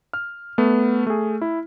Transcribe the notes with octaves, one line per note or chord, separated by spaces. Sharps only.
F6
A3 B3
A3 G#4
E4